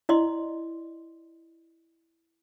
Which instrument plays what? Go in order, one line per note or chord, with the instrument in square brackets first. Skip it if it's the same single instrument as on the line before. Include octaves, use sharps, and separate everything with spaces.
[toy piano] E4 D5 D#5 C6